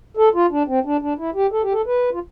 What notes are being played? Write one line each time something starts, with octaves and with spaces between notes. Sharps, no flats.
A4
F4
D4
C4
D4
D4
E4
G4
A4
G4
A4
B4
F4